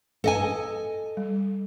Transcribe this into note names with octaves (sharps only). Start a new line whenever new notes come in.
A4 D#5 G#5
G3